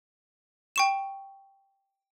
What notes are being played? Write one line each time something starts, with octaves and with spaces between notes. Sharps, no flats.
G5 C#6 E7